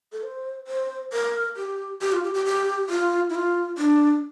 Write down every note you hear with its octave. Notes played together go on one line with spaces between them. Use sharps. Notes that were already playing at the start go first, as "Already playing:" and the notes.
A4
C5
C5
A#4
G4
G4
F4
G4
G4
G4
F4
E4
F4
D4